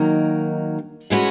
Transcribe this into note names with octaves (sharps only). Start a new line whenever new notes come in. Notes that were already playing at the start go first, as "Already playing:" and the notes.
Already playing: D#3 F#3 A#3 D#4
E3 G#3 C#4 F#4 B4